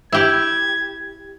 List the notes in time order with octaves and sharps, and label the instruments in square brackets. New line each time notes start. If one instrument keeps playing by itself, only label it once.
[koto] E4 G4 [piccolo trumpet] G#6